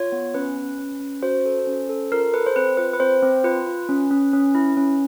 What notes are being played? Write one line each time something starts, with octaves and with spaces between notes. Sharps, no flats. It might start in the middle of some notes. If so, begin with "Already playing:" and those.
Already playing: F4 C#5
B3
C#4 B4
C#4
C#4
C#4
F#4 C5
A4
C#4
A4
F4 A#4
A4 B4
C5
C4 B4
F4 B4
B4
C4 C5
C4
F4 B4
F4
C#4
C#4
C#4
E4
C#4